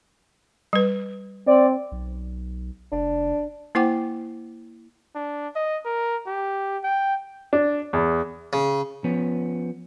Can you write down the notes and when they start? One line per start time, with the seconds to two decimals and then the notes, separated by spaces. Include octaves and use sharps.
0.73 G3 B4
1.47 C4 D5
1.92 B1
2.92 F1 D4
3.75 A#3 E4 C5 F#5 G5 D6
5.15 D4
5.56 D#5
5.85 A#4
6.26 G4
6.84 G5
7.53 D4
7.93 E2
8.53 C#3
9.04 F3 B3 C#4